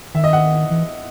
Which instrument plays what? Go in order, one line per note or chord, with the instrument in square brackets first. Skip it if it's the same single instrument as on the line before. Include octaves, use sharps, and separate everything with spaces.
[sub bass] D#3 [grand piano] E5
[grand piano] D#5
F#5
[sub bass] E3